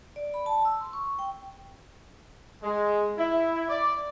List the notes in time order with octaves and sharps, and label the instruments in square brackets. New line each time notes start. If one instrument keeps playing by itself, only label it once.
[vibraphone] D5
B5
A5
E6
C6
C#6
G5
[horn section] G#3
E4
D5